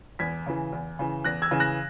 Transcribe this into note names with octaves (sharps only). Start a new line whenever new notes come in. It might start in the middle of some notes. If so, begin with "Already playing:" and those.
E2 G#6 B6
C#3 E3
E2
C#3 E3
E2 F#6 A#6
E6 G#6
C#3 E3
F#6 A#6